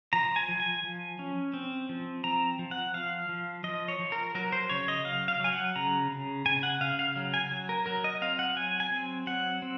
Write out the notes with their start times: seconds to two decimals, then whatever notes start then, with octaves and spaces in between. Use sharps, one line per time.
0.13 F3 A#5
0.36 G#5
0.49 F3
0.60 G#5
0.84 F3
1.19 C#4
1.54 C4
1.89 F3
2.24 C4 A#5
2.59 F3
2.71 F#5
2.94 F3 F5
3.29 F3
3.64 F3 D#5
3.88 C#5
3.99 F3
4.12 A#4
4.35 F#3 A#4
4.52 C5
4.69 C#3 C#5
4.88 D#5
5.05 F#3 F5
5.28 F5
5.40 F#3 G#5
5.53 F#5
5.76 C#3 A#5
6.11 C#3
6.46 C#3 G#5
6.63 F#5
6.81 C#3 F5
6.99 F5
7.16 F#3
7.34 G#5
7.51 F#3
7.69 A#4
7.86 F#3 A#4
8.04 D#5
8.22 C4 F5
8.39 F#5
8.56 F#3 G#5
8.80 G#5
8.92 C4
9.27 F#3 F#5
9.62 C4